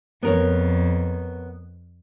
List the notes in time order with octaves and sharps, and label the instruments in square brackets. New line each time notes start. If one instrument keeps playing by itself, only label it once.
[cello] F2 [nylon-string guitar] B3 A#4 C#5